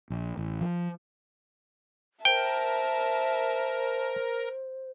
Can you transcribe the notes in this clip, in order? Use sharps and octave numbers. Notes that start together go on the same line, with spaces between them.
A#1
A1
F3
A#4 C5 E5 G5 A5